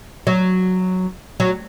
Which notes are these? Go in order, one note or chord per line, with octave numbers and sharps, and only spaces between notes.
F#3
F#3